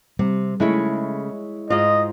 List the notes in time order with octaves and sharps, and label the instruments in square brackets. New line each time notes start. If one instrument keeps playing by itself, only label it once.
[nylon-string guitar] C3 [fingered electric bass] G3
[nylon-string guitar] C#3 A3 [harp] G#3 E4 C#5
[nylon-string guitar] G#2 F4 [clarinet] D#5